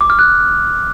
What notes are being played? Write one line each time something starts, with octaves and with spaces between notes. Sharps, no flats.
D6
F6
F#6